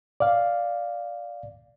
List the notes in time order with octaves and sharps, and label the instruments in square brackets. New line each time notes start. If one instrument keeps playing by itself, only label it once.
[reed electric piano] D5 F5